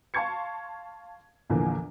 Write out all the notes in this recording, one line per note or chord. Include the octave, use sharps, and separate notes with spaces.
F5 A5 C6 C#6 G#6 C#7
A#1 E2 D3 E3 F3 A#3